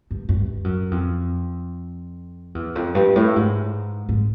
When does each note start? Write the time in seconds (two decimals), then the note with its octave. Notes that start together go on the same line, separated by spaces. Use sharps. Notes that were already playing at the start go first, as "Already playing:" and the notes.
0.11 G2
0.29 F#2
0.38 G2
0.64 F#2
0.91 F2
2.55 E2
2.75 F2
2.95 G2
3.16 A2
3.36 G#2
4.09 G#2